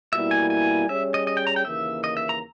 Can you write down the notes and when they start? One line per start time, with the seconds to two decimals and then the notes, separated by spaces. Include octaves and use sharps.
0.12 B2 G3 A#3 E4 E5
0.31 G#5
0.50 G#5
0.89 G3 C#4 G#4 C#5 E5
1.14 D#5
1.27 D#5
1.37 G5
1.47 A#5
1.56 G5
1.65 D#2 C#3 E3 A#3 E5
2.04 D#5
2.17 E5
2.29 A#5